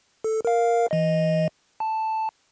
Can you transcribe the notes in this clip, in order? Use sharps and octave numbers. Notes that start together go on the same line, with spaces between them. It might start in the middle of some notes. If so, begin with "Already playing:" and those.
A4
A#4 F5
E3 D#5
A5